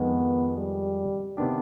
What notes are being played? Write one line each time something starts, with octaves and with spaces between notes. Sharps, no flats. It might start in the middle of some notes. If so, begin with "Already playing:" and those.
Already playing: F2 D#3 G#3 B3
G3
C3 D#3 B3 D4 G4